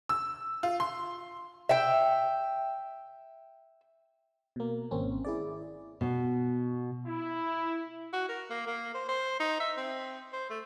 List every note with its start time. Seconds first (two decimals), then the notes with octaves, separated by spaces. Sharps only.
0.09 E6
0.63 F4
0.80 C6
1.69 E5 G5
4.56 B2 A#3
4.91 G#1 A#3 C4 C#4
5.25 E4 G#4 D5
6.01 B2
7.06 E4
8.13 F#4
8.29 A#4
8.50 A#3
8.67 A#3
8.94 C5
9.08 C5
9.40 D#4
9.60 E5
9.77 C4
10.33 C5
10.50 A3